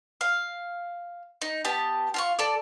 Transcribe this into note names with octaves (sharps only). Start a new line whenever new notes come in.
F5
D#4
B3 G4 A5
F4 F5 C#6
A4 D5